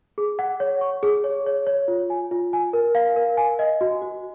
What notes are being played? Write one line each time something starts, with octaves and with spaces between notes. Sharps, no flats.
G#4
F#5
C#5
C#6
G#4
C#5
C#5
C#5
F4
G#5
F4
G#5
A#4
F5
A#4
G#5
D#5
F#4
F#4